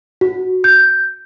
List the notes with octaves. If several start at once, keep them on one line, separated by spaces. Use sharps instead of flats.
F#4
G6